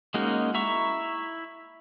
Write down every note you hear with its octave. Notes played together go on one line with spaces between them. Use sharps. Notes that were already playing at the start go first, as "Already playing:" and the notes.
G#3 A#3 C#4 D#4 F#4
E4 E5 A#5 C#6